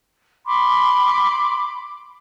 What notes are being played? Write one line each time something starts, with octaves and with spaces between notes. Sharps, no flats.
B5 C6 D6